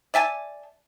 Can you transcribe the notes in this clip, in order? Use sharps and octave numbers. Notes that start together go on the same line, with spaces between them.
D5 E5 G#5 A5